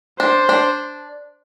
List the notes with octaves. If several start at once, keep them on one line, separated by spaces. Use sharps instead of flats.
D4 C5
D4